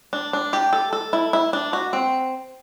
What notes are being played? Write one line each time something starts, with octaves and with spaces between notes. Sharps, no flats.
D4
D4
G4
A4
A4
E4
E4
D4
F#4
C4